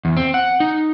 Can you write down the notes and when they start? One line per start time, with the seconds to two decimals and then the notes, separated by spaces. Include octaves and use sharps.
0.05 E2
0.17 C4
0.34 F#5
0.60 D#4